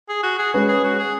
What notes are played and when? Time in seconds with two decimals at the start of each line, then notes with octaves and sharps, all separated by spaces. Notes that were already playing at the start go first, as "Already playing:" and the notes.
0.09 G#4
0.23 F#4
0.39 G#4
0.54 G#3 C#4 F#4 B4
0.69 G#4
0.84 F#4
0.99 G#4